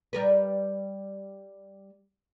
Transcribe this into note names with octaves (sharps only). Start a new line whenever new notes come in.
G3 A#4 B4